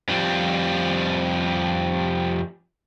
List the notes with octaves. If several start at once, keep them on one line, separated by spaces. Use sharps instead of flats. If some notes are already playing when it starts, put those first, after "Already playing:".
F2 G3